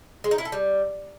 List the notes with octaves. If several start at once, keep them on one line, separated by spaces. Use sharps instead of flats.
G#3
D#4
E4
A4
G3